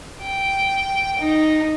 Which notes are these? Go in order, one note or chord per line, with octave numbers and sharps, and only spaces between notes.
G5
D#4